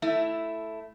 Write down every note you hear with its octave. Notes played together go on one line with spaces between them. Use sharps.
A3 E4